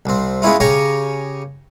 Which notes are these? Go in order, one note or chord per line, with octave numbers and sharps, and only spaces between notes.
C2 C4
G#3 B3 C#4 E4 F4
C#3 G4 C#5 G#5 A#5 C#6